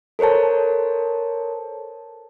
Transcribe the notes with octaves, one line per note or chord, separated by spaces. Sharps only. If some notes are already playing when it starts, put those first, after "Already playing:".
A4 A#4 C5 C#5 A5